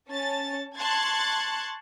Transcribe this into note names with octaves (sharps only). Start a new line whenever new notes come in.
C#4 A5 A6
A5 C6 C#6 F#6 G#6 A6